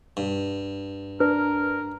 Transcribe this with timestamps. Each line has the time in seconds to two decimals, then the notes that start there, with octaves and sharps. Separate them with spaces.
0.17 G2
1.20 D4 A#4 B4